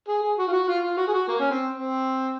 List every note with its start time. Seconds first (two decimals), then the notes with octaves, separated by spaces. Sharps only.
0.08 G#4
0.22 G#4
0.38 F#4
0.47 F4
0.53 F#4
0.68 F4
0.83 F4
0.97 F#4
1.08 G#4
1.13 F#4
1.28 A#3
1.40 C#4
1.51 C4
1.72 C4